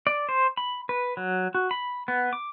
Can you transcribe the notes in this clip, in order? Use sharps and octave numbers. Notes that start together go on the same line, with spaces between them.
D5
C5
B5
B4
F#3
F#4
B5
B3
D6